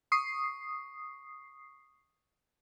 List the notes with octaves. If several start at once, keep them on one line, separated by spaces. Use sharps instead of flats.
C#6 D#6 C7